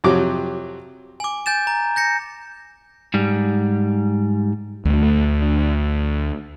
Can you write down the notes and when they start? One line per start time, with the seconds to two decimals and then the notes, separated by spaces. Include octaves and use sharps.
0.04 F2 C3 F#3 D6
1.20 G#5 D6
1.46 G#5 G6 A6 E7
1.67 A#5
1.96 G6 A#6 C#7
3.14 G#2 G3
4.85 D2 A3